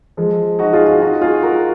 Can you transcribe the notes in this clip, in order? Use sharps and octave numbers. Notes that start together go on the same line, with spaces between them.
F3 G#3
D#4 F#4
F4 G#4
F4 G#4
D#4 F#4
F4 G#4
F#4 A#4